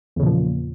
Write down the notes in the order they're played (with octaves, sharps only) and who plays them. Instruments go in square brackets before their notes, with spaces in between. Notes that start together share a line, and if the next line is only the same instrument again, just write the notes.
[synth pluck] E2
C#3
A#2
F3